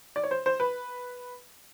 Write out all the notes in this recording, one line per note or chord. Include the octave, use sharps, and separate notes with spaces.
D5
C#5
C5
C5
B4